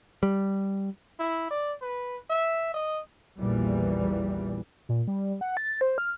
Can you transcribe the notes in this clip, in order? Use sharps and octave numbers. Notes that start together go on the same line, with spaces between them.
G3
E4
D5
B4
E5
D#5
A#1 E2 A#2 E3 G3
A#2
G3
F#5
A6
C5
F6